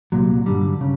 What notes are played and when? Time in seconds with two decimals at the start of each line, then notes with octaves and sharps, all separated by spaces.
0.12 C2 A#2 F#3
0.46 G2 D3 G3
0.81 C#3